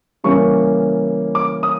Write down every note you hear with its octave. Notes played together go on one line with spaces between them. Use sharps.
C#3 E3 G3 A#3 C#4 C#6
D6
D#6